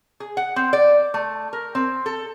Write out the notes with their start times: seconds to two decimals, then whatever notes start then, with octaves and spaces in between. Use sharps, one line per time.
0.20 G#4
0.37 F#5
0.56 C4
0.73 D5
1.14 A3
1.53 A#4
1.75 C4
2.06 A4